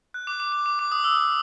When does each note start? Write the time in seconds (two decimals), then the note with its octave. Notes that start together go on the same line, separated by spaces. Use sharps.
0.14 F#6
0.27 D6
0.40 D6
0.52 D6
0.66 D6
0.79 D6
0.92 D#6
1.04 E6
1.17 E6